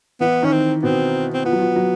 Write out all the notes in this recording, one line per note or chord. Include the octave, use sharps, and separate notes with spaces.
E3 B3 E4
D#3 C#4 D#4
C4
B2 B3 C4
C4
F3 B3
F#3
F3
F#3